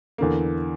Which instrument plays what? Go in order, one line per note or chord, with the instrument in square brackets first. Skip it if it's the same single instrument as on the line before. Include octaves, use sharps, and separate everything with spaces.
[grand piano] E2 D3 A#3